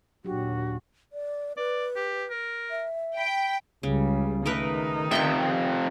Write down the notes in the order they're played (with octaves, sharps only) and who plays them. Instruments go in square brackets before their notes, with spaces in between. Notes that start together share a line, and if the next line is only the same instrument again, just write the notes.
[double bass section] D#2 A#2 [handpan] F#3 G4 [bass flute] D4 [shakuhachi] F#4
[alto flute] D5
[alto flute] B4 [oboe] D5
[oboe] G4
A#4
[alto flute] E5
[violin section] G5 [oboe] B5
[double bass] C#2 G3 [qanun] C#3
[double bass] D#3 D#4 [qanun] A3 A#4 B4
[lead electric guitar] F2 C3 [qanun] E5 G5 C#6